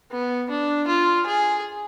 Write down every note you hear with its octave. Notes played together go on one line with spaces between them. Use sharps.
B3
D4
F4
G#4